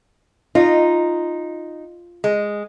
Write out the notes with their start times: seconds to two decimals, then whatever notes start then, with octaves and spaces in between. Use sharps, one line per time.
0.55 D#4 F4
2.24 G#3